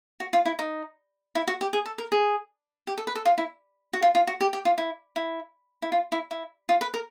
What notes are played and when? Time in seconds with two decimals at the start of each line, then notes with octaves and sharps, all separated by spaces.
0.20 F#4
0.33 F4
0.46 E4
0.59 D#4
1.35 E4
1.48 F#4
1.61 G4
1.73 G#4
1.86 A4
1.98 A#4
2.12 G#4
2.87 G4
2.98 A4
3.07 B4
3.15 A4
3.25 F4
3.38 E4
3.93 F#4
4.02 F4
4.15 F4
4.27 F#4
4.41 G4
4.53 G4
4.65 F4
4.78 E4
5.16 E4
5.82 E4
5.92 F4
6.12 E4
6.31 E4
6.69 F4
6.81 B4
6.94 A#4